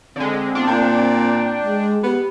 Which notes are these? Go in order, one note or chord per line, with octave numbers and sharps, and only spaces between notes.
D3 G#3 C4
B3 D4 F4
A#2 G5
G#3
B3 G4